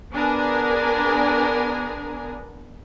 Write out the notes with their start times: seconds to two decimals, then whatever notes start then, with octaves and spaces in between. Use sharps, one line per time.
0.12 B3 D4 G#4 A#4 G#5